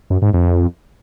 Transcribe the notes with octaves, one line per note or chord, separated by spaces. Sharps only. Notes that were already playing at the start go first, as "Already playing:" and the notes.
F#2
G#2
F2